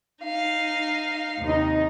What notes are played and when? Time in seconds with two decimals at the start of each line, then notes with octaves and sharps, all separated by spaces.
0.23 D#4 F5
1.40 D#2 C3 D#4